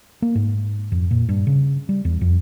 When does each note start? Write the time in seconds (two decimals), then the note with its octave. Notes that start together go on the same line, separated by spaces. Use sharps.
0.22 A#3
0.35 G#2
0.92 F2
1.11 A#2
1.29 G2
1.47 C#3
1.89 G3
2.05 E2
2.21 F2